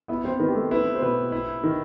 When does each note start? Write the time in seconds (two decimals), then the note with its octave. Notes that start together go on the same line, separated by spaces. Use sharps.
0.08 B3 E4 E5
0.24 C4 C5
0.40 D#3 B3 B4
0.48 G4
0.55 A3 A4
0.71 B3 E4 B4
0.95 C5
1.01 B2 B3 B4
1.32 E4
1.64 D#3